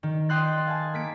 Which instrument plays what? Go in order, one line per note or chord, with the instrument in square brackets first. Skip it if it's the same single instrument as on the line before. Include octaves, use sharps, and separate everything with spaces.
[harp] D#3
D#5 G5 C6 F#6 A6
F5 G#5 A5
A#3 B6 D7